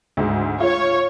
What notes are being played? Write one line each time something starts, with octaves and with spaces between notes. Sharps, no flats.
D2 G#2
F4 C#5